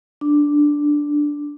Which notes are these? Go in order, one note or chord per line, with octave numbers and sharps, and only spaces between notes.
D4